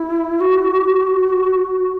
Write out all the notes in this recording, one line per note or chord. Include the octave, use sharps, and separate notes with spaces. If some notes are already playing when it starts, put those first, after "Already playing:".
Already playing: E4
F#4